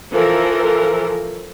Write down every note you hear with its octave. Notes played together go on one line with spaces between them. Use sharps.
E3 F3 A4 A#4